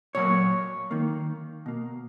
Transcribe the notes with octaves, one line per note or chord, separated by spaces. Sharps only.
A#2 F#3 A#3 C#5
D#3 A#3
B2 A#3